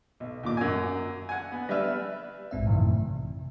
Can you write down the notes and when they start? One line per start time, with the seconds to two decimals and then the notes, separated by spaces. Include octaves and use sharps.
0.20 B1
0.43 D#2 A#2 D6
0.57 F#2 G#5
1.29 F#5 G#5
1.52 B3
1.69 G3 D4 B4 E5 F6
2.51 A#1 G#2 C4 E5
2.66 F#2 A2 C3 D#3 E3
2.91 C3